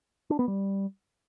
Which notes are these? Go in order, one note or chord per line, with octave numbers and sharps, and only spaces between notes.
D4
B3
G3